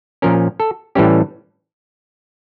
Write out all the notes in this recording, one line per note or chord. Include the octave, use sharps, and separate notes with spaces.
A#2 F3 C#4 A#4
A4
A2 E3 G3 C#4 G4